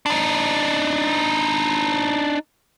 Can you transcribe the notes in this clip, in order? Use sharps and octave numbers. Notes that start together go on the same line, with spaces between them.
D4 D#4